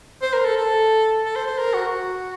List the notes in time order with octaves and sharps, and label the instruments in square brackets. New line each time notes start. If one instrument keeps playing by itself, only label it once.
[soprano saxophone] C5
A#4
A4
A4
A4
C5
C5
A#4
F#4
F#4